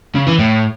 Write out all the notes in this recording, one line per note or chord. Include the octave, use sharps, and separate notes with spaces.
C#3
E3
A2